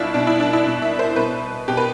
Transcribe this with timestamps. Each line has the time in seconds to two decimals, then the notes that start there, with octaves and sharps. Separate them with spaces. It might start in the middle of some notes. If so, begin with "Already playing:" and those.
Already playing: B2 D4 E4 F4
0.14 B2 D4
0.27 E4
0.40 D4
0.53 E4
0.66 B2
0.82 E5
0.99 C5
1.16 B2 B4
1.68 B2 G4
1.77 B4